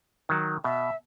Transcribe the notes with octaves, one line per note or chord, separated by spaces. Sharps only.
D#3 F#3
B2 E5